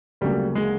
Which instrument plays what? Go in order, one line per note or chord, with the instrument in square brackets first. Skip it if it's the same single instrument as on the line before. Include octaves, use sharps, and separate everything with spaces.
[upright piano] D2 C#3 F#3 A#3 [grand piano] G3
[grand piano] G#3